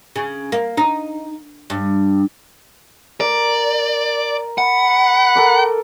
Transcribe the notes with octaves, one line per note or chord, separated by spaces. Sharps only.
C#3
A#3
D#4
G2
A#4 D5
F#5 B5
A4 A#4 D6